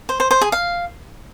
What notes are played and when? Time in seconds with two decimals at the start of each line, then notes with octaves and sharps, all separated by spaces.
0.09 C5
0.20 C5
0.31 C5
0.41 G#4
0.52 F5